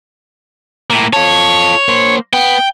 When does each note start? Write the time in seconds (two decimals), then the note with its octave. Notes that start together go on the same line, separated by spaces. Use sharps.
0.90 A2 A#3
1.13 F4 A4 C#5
1.88 A#3 C5
2.33 B3 G5